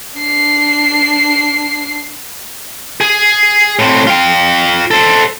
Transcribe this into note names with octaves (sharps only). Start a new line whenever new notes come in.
D4 C7
G#4
A2 C4
F4 G5
A4 C5